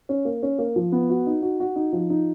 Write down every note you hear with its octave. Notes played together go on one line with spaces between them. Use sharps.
C#4
A#3
C#4
A#3
F3
B3
F#4
D#4
F#4
F#4
D#4
F3
D#4